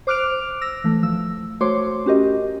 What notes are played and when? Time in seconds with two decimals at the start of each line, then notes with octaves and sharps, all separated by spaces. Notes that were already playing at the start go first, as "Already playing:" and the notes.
0.07 C5 D6 F6 F#6 D7 F7
0.61 E6 A#6
0.84 E3 A3
1.03 F3 E6
1.60 A3 F#4 C5 C#5 C6 D6
2.06 C#4 F#4 G4 A#4 D#5